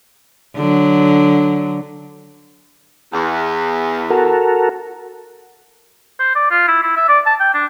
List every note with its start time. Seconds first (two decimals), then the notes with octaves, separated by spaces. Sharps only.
0.56 D3 F#3
3.13 E2
4.10 F#4 A4 A#4
6.20 C5
6.35 D5
6.51 F4
6.68 E4
6.83 E4
6.97 E5
7.08 D5
7.26 A5
7.40 G5
7.54 D4